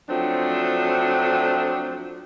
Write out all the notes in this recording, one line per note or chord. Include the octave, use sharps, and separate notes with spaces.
F3 F#3 A3 C4 D4